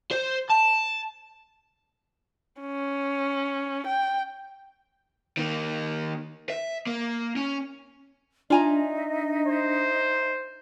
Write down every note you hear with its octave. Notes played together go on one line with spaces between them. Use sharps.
C5
A5
C#4
G5
D#3 A#3
E5
A#3
C#4
D4 D#4 F4 D#5 E5 G#5 A#5
C5